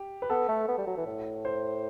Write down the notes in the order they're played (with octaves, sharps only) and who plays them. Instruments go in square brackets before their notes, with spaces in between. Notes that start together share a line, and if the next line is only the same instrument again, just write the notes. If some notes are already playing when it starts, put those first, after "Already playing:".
Already playing: [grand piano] G4
B4
[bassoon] B3 [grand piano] A4
[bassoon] A3
B3
G3
F#3
E3
A2
[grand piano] C5